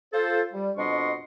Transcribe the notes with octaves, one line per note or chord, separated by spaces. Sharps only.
F4 A4 C5
G3
F2 B2 D4 D#5 C6 C#6